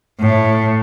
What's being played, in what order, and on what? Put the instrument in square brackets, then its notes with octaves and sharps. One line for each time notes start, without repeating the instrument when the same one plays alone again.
[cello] A2